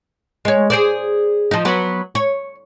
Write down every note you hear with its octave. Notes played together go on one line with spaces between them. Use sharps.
G#3 C#5
G#4 C5 D5
F3 D#4
F#3 B3
C#5